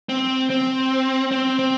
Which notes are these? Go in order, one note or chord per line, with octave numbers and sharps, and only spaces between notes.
C4
C4
C4
C4